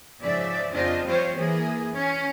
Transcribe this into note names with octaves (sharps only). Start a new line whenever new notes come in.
G#2 C#3 F3 D5 E5
F2 C#3 C4 D4 F4 D#5
F3 G3 C4 F4 C5 C#5
E3 A#3 G#4
C#4